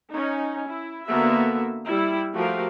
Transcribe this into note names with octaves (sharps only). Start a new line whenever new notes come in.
C#4 D#4
E4
D3 A#3 B3 F#4 E5
G3 E4
F3 A3 F#4 G4 A#4 F5